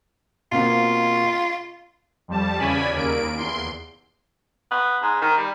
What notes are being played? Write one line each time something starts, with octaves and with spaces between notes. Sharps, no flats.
B2 A#3 C4 F4
F2 G3 A5
E2 C#3 C#4 D5 G#5 B5
D#2 A#3 D7
E2 C6
B3
G#2
D#3
G3